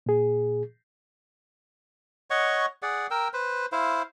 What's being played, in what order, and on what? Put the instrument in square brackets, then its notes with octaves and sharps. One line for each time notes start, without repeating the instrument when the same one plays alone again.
[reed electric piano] A#2 G#4
[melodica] C#5 D#5 F#5 C#6
G#4 D5 F#5
A#4 G5 E6
B4 C5
E4 C5 F5